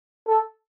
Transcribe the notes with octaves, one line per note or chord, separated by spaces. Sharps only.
A4